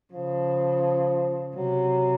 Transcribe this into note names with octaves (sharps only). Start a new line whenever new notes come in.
C#3 F3
C3 F#3